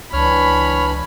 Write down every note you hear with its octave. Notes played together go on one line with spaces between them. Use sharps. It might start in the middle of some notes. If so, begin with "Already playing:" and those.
C#2 E3 D4 C#5 B5 F6